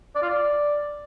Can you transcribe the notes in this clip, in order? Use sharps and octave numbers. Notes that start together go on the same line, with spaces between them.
D5
F4
D5